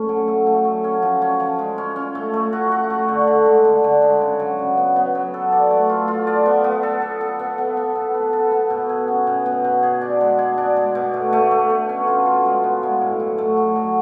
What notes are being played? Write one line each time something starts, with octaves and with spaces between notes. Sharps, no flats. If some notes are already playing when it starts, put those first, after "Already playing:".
Already playing: A3 C#4
F#3
A3
A3
F#3
C#4
F3
C#4
F3
G#3
C#4
C#4
A3
A3
F#4
F#4
A3
D3
D3
G#3
D3
D3
G#3
C#3
F#3
C#3
B3
B3
F#3
A4
D5
A3
F4
F4
D5
B3
B3
A4
A4
A4
B3
B3
B3
A4
B3
A4
B3
B2
G#4
C#4
B2
B2
B2
G#4
D4
G#3
G#4
D4
G#3
B2
A3
A3
A3
B2
C#4
F4
F4
G#3
B3
G#3
A2
F#3
A3
F#3
F#3